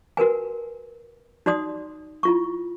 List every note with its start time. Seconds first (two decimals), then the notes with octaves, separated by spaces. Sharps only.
0.17 F#4 A#4 B4 G#5
1.46 D#4 F#4 D5 C6 D#6
2.23 E4 F4 C#6